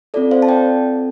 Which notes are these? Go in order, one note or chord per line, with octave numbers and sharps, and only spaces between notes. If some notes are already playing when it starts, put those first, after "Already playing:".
C4 F4 A4 D5
C5 F5
A5
D5 G5